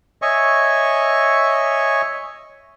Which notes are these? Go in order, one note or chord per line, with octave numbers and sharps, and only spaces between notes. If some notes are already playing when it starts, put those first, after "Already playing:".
C#5 D#5 E5 G#5 C#6